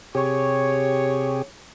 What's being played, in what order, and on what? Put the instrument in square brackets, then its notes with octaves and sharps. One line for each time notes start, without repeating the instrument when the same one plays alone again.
[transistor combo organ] C3 G4 G#4 [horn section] C#5